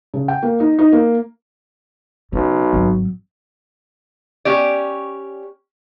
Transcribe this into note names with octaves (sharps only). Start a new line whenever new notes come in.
C#3
G5
A#3
D#4
D#4
A#3
B1 C#3
G#1 F#3
C#4 G4 D5